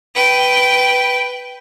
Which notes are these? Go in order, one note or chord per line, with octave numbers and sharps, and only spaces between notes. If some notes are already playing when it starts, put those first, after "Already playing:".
B4 G5